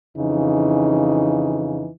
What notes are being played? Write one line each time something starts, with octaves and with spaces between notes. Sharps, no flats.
F2 C#3 E3 D#4